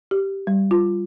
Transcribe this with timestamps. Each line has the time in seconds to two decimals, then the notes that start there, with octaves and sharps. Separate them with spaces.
0.11 G4
0.47 G3
0.71 F4